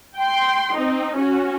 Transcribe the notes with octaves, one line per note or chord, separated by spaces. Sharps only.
G5 C6
C4 D#4
C#4 F#4